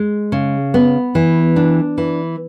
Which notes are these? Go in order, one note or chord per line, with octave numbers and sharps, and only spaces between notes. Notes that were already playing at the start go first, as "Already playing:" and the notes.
Already playing: G#3
C#3
B3
E3
D4
E3